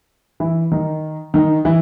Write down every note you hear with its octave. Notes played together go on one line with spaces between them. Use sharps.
E3 E4
D#3 D#4
D#3 D#4
E3 E4